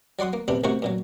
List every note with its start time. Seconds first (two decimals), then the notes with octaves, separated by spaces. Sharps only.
0.19 F#3 D5 F#5 C6 D#6
0.33 A#3
0.48 A#1 C3 B3 D4 B5
0.64 A1 C3 A#3 F#4 C5 C#6
0.82 F#2 A#2 F#3